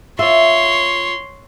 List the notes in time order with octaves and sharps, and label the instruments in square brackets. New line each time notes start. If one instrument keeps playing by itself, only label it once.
[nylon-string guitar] F4 E5 [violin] C#5 [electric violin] C6